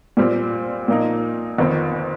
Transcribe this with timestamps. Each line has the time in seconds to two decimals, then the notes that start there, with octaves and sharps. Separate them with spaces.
0.17 A#2 G3 C4
0.88 A#2 F3 A#3 D#4
1.58 G1 F2 D#3 C4